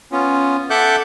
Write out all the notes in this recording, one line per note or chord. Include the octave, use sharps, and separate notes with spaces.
B3 C#4 F4
A4 E5 F#5 D6 F#6 G6